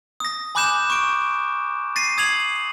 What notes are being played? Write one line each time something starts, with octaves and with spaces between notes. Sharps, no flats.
D#6 A#6
G#5 B5 D6 F#6 G6 E7
C#6 D7
A6 A#6 C7 D#7
D#6 G#6 C7 F7 F#7